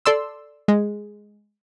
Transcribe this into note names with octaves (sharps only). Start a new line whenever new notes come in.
A4 D5 C6 E6
G#3